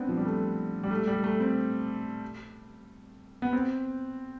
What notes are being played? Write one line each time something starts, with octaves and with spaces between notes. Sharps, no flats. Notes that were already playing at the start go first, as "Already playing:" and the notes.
Already playing: B3 C4 D4
F3
G3
A3
G3
A3
G3
A3
C4
B3
C4